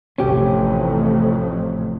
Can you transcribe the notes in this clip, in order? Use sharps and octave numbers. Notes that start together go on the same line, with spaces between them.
A1 F2 C3 C#4 G4